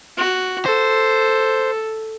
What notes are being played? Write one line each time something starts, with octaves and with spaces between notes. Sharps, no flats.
F#4
A4 C5